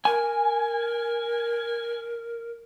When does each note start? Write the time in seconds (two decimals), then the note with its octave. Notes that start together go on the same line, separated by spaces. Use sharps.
0.05 A#4 G#5